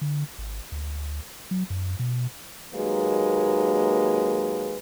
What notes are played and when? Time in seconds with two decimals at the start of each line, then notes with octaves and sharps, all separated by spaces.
0.01 D3
0.38 G#1
0.72 D2
1.51 F#3
1.70 F#2
1.99 B2
2.73 D#2 F#3 G#3 A#3 B4